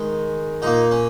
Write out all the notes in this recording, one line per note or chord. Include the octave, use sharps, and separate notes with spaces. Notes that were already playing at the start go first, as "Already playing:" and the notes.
Already playing: D#3 G#3
A#2 A#3 D#4
C#4